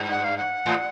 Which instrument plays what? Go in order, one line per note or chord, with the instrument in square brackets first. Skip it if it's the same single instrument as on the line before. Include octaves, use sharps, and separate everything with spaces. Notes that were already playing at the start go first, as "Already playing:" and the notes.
Already playing: [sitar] G2
[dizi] F#5
F5
F#5
[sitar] G#2